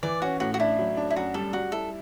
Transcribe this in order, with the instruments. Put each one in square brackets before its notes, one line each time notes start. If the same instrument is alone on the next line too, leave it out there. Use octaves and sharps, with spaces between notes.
[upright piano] E3 [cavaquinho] D5
[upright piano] C#4 [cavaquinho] F#4
[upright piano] A2 [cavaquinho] F#4
[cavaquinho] F#4
[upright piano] D4 [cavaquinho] E4
[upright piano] F#3
D4
[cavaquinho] E4
[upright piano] F#2 [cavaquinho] F#4
[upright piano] G3 [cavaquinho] A4
[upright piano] G3 [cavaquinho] F#4
[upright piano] E4 [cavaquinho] A4